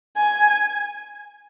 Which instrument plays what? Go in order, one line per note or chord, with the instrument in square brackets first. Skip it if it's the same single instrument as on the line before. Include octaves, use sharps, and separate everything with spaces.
[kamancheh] G#5